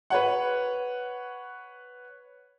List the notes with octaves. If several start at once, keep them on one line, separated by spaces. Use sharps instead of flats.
B4 C#5 F#5